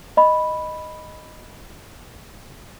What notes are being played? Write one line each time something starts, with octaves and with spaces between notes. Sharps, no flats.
D#5 B5